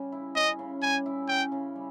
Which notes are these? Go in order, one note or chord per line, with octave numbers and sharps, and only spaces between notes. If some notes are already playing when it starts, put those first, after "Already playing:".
Already playing: C#3 G3 C#4
E4
C#4 D#5
C#3
G3 G#5
E4
C#4 G5
C#3
G3